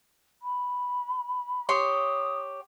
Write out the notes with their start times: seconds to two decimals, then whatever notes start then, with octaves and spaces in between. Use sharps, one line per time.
0.42 B5
1.69 G4 C#5 C6 D#6